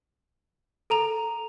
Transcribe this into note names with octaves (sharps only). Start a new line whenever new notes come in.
A4 A#5 F7